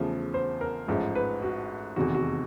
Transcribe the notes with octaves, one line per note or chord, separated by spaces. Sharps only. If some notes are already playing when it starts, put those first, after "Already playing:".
Already playing: E2 C#3 F3 A3
C5
A#4
A1 G#2 F3 A3
B4
F#4
F1 E2 C3 D#3 F#4
F#4